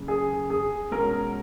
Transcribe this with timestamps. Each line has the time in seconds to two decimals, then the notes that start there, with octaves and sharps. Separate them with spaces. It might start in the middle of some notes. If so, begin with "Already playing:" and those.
Already playing: F#2 C#3
0.08 G#4
0.50 G#4
0.91 B2 G#3 C#4 F#4 A#4